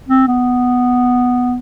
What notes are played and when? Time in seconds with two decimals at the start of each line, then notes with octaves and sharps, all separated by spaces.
0.09 C4
0.27 B3